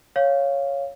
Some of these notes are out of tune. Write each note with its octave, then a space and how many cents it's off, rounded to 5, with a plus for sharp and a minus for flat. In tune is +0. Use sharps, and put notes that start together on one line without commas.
C#5 +0 F5 +0